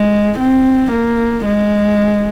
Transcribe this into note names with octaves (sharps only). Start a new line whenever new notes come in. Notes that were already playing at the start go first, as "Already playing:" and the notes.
Already playing: G#3
C4
A#3
G#3